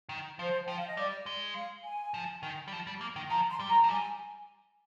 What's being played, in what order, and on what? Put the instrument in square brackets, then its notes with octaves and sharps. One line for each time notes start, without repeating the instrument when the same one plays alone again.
[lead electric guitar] D#3
[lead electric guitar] F3 [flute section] C5
[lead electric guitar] F3 [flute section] G5
[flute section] F5
D#5
[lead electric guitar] G3 [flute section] D5
[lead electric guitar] G#3
[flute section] F5
G#5
[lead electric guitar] F3
D#3
G3
F3
G3
A#3
D#3
[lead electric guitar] F3 [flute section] A#5
[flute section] C6
[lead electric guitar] G3
[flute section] A#5
[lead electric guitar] F3
[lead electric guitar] G3 [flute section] G#5